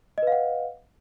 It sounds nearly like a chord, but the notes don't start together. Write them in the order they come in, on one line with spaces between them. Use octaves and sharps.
D#5 B4 F5 F#5